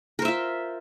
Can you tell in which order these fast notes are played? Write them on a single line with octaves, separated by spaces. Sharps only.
A#4 C5 E5 F4